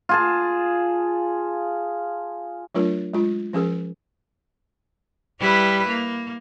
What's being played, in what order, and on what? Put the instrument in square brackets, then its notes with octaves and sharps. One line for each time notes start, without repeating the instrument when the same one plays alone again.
[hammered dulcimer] F4 G#4 A5
[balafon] F#3 A3 D4 F4 A#4
G#3 F4
F3 C#4 G#4 A#4
[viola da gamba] G3 E4 B4
A#3